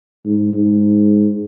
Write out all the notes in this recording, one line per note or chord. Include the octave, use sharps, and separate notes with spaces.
G#2
G#2